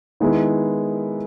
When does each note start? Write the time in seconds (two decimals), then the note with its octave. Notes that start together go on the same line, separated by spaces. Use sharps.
0.20 D#3 G#3 B3 E4